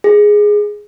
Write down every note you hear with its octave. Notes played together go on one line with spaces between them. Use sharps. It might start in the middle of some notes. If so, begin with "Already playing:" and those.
G#4